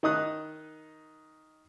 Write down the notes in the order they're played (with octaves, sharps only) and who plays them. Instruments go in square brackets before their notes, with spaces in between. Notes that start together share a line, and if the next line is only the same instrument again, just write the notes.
[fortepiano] D#3 D#4 D#6 F#6